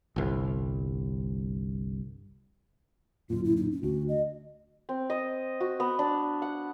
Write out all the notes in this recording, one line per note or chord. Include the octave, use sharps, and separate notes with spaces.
G1 C2
D1 F#2 A#2 F4
E4
D#4
C#4
D2 F#4
D#5
C4
D#5
F#4
B3
D4
F#5